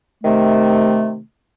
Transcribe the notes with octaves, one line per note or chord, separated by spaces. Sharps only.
C3 D#3 A3